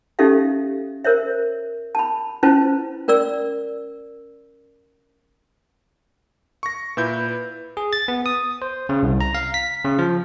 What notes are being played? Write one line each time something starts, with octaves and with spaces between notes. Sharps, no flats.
C#4 D#4 G4 A4 E5 F5
A#4 C5 C#5 E5
A5 B5
C#4 E4 F4 B4 C5 A5
C#4 A#4 D5 E6
C#6 A#6
A#2 E4 B4 G6
G#4
A6
B3
D#6
C5
C#3
C2
A#5
F5
B6
C#3
F3